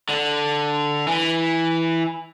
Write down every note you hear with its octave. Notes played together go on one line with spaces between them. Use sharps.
D3
E3